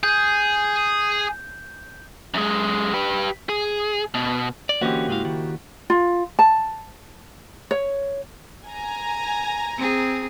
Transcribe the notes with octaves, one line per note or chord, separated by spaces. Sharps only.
G#4 G6
F#2 G#3
G4 B4
G#4
B2
D5
D3 E3 A#3 C#4 F#4 G4 C5 D#5
G#2 C#3 G#3 E4 F5
D#3
F4
A5
C#5
G#5 A#5
C4 G#4